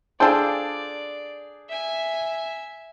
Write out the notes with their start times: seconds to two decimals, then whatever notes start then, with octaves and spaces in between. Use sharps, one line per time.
0.20 D4 F4 G#4 A4 C5 D5 G5
1.69 E5 G#5